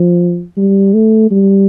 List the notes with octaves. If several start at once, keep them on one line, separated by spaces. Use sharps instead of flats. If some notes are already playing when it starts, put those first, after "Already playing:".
Already playing: F3
G3
A3
G3